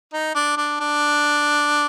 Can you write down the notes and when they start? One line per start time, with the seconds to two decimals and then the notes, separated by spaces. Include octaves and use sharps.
0.13 D#4
0.35 D4
0.57 D4
0.80 D4